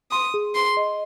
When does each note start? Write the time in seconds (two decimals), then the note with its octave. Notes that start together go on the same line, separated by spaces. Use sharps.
0.11 C6 D#6
0.34 G#4
0.55 G#4 C6
0.77 D#5